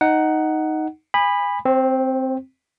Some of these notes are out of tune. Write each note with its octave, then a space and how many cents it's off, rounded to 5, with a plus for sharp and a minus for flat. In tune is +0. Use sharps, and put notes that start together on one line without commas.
D#4 +0 F#5 +10
G#5 -30 B5 +0 D#6 -40
C4 +0 C5 +45